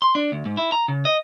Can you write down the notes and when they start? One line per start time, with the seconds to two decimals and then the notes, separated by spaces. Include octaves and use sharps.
0.02 C6
0.15 D4
0.32 D2
0.45 G#2
0.57 E4
0.72 A#5
0.88 C#3
1.05 D#5